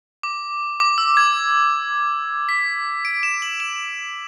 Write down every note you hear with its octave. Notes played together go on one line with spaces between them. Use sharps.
D6
D6
E6
G#6
B6
D7
E7
F#7
E7